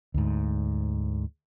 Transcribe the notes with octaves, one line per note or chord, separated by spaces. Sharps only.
D2 G#2